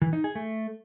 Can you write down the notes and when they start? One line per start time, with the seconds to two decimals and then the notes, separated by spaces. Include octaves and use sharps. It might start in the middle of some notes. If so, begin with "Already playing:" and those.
0.02 E3
0.13 D#4
0.24 G#4
0.35 A3